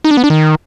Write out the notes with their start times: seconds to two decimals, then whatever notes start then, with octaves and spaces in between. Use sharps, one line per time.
0.04 D#4
0.11 D4
0.17 B3
0.24 D4
0.30 D#3